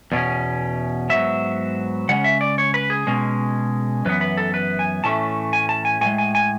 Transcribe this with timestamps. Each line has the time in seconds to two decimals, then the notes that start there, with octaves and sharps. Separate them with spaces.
0.12 E2 B2 C#4
1.10 G#2 F#3 B3 E5
2.09 C#3 G#3 C#4 F#5
2.24 E5
2.41 D5
2.58 C#5
2.74 B4
2.90 G#4
3.07 B2 G#3 C#4
4.05 F#2 E3 B3 B4
4.21 B4
4.37 A4
4.54 B4
4.79 G#5
5.04 A2 E3 A3 C#4 A5
5.53 G#5
5.69 A5
5.85 G#5
6.01 A2 E3 G#3 G#5
6.18 G#5
6.35 G#5